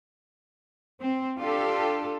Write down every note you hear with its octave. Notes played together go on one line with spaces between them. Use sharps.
C4
D4 F4 G4 A4